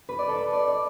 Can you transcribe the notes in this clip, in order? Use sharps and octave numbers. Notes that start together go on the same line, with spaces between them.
B4
D5
A4
B4
D5
D5